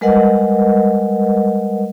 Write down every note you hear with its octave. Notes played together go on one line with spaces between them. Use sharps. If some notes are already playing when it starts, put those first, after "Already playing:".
G3 G#3 A#4 B4 D#5 F#5